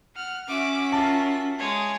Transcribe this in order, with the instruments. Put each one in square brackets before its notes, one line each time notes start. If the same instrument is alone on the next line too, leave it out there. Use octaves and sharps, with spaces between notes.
[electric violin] F#5 F6
[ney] C#4 [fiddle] F#4 E5 [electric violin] D6
[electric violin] F4 A#4 [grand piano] A5
[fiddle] G#3 [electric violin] C#5 D#6